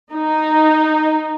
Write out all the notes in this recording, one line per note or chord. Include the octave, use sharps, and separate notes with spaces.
D#4